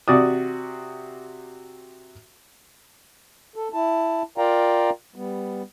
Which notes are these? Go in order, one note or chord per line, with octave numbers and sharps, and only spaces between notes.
C3 F#4 D5 D#6
A4
E4 A5
F4 A#4 D5 F5 G5 A#5
G3 B3